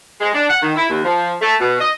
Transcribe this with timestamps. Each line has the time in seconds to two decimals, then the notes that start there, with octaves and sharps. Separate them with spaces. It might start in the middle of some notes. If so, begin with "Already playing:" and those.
0.19 G#3
0.33 D4
0.48 F#5
0.61 D#3
0.75 E4
0.89 D#2
1.03 F3
1.41 A3
1.60 B2
1.80 D#5